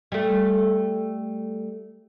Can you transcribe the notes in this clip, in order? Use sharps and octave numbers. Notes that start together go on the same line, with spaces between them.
G3 A3